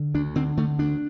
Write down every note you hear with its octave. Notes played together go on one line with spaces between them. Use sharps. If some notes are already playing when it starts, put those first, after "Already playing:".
Already playing: D3
D2 D4
D3 C4
D3 A3
D2 D4